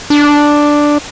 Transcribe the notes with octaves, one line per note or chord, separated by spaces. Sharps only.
D4